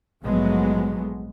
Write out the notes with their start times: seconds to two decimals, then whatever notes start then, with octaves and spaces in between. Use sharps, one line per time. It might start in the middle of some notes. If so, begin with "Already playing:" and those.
0.24 A#1 G#2 F#3 G#3 A3 B3